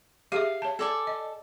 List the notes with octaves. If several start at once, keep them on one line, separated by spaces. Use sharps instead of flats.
G4 G#4 E5 F5
C#5 A5
A4 D5 G#5
D#5